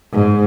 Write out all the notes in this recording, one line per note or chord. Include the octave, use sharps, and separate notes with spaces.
G#2